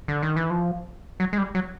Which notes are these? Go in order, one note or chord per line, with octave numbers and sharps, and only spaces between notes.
D3
D#3
E3
F3
F#3
G#3
G3
F#3